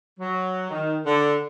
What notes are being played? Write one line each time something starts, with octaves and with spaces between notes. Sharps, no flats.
F#3
D#3
D3